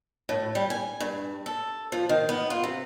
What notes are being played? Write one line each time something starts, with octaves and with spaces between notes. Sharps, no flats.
A2
G3
G#5
G2
A4
F3
D#3
B3
F4
C3